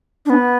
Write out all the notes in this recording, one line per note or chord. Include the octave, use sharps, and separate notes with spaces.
D4
B3